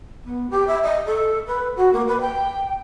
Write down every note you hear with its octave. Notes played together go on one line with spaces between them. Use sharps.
B3
G4
E5
D#5
A4
B4
F#4
A#3
B4
G5